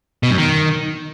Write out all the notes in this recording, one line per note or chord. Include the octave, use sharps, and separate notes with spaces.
B2
F#2
D#3